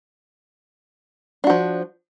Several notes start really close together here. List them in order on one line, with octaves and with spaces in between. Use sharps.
D4 F#4 F3